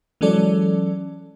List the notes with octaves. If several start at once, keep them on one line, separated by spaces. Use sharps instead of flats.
E3 F#3 G#3 C#4 A4 D5